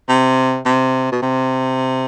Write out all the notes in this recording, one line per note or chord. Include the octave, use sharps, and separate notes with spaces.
C3
C3
B2
C3